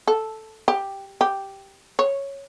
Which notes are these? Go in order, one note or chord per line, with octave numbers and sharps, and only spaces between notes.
A4
G4
G4
C#5